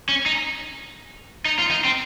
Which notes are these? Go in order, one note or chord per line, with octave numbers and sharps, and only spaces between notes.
C#4
D#4
D#4
F4
D#4
C4